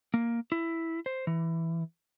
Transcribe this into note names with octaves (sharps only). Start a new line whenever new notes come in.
A#3
E4
C5
E3